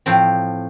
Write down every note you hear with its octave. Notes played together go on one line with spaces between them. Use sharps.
A2 F3 C4